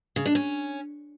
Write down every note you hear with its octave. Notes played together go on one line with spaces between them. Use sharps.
C#3
D4
C#4